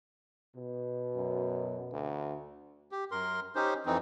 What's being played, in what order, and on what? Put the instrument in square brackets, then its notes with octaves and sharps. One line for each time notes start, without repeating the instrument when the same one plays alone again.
[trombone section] B2
[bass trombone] F#2
D2
[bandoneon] G4
F#2 A#4 C6
C#4 D#4 G4 C5
F2 E3 C4 D#4